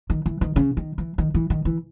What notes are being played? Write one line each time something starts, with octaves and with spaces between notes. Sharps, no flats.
D#3
E3
D#3
C#3
D#3
E3
D#3
E3
D#3
E3